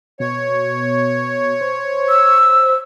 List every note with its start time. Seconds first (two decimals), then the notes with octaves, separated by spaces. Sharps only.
0.20 B2 C#5
1.61 C5
2.09 E6